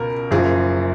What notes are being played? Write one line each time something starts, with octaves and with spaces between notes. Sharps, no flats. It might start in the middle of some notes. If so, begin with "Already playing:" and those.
Already playing: C#2 B2 A#4
F#1 F#2 F3 G#4